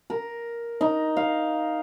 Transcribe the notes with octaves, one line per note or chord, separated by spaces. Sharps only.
A#4
D#4
F5